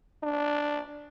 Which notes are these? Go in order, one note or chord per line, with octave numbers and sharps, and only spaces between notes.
D4